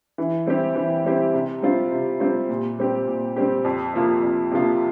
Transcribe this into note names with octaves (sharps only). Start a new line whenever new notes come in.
E3
G3 C4 E4 G4
E3
G3 C4 E4 G4
C3
G3 C4 F4
C3
G3 C4 F4
A#2
G3 C4 G4
A#2
G3 C4 G4
F2
C3 F3 A#3 F4
F2
C3 F3 A#3 F4